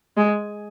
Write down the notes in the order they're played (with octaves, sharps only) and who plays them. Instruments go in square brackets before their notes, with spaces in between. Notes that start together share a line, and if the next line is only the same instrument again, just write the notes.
[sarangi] G#3